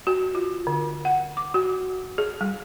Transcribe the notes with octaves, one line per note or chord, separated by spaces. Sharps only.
F#4
F4
D3
F#5
D6
F#4
G#4
G3